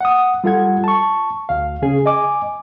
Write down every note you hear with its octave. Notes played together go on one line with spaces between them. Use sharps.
F#5 D#6
G3 F4 A4 F#5 G#6
A5 C#6
D2 F5
C#3 C#4 G#4
D#5 G#5 D6